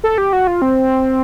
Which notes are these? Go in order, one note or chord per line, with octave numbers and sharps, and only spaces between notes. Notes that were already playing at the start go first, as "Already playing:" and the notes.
A4
G4
F#4
F4
C4